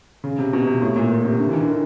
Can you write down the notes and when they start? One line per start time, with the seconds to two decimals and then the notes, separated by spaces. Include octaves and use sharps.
0.24 C#3
0.39 C3
0.53 B2
0.67 C3
0.82 A2
0.96 A#2
1.11 A#2
1.25 C3
1.39 D3
1.49 E3
1.53 D#3
1.61 D3
1.68 D#3